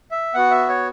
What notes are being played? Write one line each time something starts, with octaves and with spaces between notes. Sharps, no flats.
E5
B3 F#4 F#5
E5
C#5